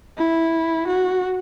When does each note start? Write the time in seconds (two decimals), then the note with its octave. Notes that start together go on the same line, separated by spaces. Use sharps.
0.17 E4
0.87 F#4